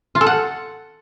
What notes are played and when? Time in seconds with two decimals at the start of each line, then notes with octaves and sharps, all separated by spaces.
0.15 F4
0.21 A4
0.26 F#5